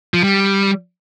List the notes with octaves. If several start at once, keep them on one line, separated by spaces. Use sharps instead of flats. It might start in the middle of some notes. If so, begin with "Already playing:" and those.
F3
G3